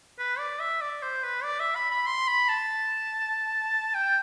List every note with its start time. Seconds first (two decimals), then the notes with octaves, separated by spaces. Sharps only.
0.19 B4
0.39 D5
0.60 E5
0.81 D5
1.02 C5
1.24 B4
1.43 D5
1.60 E5
1.75 B5
1.91 B5
2.07 C6
2.28 B5
2.49 A5
3.95 G5